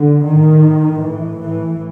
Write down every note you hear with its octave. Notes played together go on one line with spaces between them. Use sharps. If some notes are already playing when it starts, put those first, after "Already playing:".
Already playing: D3
A2 D#3
A2 E3
E3